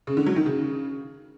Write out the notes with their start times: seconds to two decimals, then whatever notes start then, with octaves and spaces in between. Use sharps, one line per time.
0.07 C#3
0.17 D3
0.27 F#3
0.36 D#3
0.46 C#3